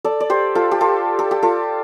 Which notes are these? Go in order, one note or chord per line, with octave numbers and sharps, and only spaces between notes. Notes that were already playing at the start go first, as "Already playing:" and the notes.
A4 D5
D5
G4 C5
F4 A4
G4
F4 A4
A4
G4
F4 A4